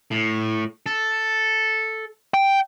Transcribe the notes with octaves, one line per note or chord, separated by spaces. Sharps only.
A2
A4
G5